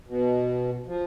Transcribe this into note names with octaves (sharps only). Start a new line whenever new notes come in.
B2
F3